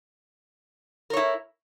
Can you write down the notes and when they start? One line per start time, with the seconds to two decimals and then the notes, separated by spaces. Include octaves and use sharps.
1.10 A#4
1.13 C#5
1.17 E4